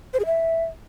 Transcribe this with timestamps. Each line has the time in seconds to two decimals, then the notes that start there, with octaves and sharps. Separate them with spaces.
0.13 C5
0.20 G#4
0.26 E5